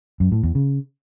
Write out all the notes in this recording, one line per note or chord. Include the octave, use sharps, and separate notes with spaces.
F#2
A2
E2
C#3